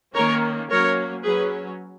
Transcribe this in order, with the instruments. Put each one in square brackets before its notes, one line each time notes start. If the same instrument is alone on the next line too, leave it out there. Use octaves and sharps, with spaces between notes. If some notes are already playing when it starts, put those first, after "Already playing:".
[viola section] D#3 A#3 C#4 A#4 C#5
F#3 A#3 C#4 A#4 C#5
F#3 C#4 G#4 B4